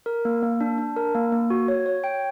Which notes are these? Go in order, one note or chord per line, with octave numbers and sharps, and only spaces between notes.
A#4
A#3
A#3
D4
D4
A#4
A#3
A#3
F#4
C#5
C#5
G5